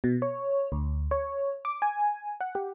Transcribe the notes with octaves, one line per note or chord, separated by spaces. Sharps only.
B2
C#5
D2
C#5
D6
G#5
F#5
G4